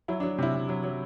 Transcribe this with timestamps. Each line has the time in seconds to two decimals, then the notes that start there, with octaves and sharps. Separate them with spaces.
0.08 F#3 E4
0.20 D4
0.23 F#3
0.38 C3 E4
0.54 C3
0.69 F#3
0.84 F#3